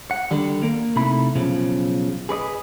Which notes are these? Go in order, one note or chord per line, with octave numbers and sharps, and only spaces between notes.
F#5
D3 D#3 G3
A#3
C3 A3 D#4 E4 B5
B1 C#3 F3
G#4 B4 D5 D#5